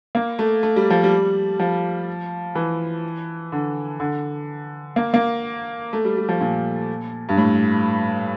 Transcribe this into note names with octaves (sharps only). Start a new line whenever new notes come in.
A#3
A3
A3
G3
F3
G3
F3
E3
D3
D3
A#3
A#3
A3
G3
G3
F3
A#2
G2
A2